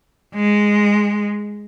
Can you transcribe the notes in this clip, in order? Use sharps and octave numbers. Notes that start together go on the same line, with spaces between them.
G#3